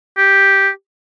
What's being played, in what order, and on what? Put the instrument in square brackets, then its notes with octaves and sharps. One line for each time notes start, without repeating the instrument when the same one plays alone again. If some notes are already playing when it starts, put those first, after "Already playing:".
[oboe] G4